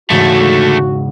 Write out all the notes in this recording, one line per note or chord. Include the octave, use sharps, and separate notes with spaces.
E1 D2 G#2 C#3 A3 F#4